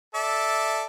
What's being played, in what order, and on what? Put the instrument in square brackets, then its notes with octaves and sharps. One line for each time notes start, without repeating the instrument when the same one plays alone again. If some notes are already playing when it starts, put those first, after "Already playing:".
[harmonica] A4 D5 E5